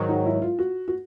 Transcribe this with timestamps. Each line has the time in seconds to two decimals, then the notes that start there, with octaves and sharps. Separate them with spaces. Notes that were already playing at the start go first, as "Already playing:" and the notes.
Already playing: G#2 D#3 F#3
0.09 D#4
0.26 E4
0.42 F4
0.59 F#4
0.88 F#4